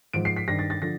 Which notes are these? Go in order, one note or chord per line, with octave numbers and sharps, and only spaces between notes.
G#2 F3 D7
C7
B6
G2 D#3 A#6
A6
A6
D3 F3 A#6